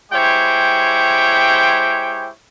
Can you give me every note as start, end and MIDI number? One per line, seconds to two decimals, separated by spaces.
0.12 2.30 56
0.12 2.30 64
0.12 2.30 67
0.12 2.30 72
0.12 2.30 73
0.12 2.30 79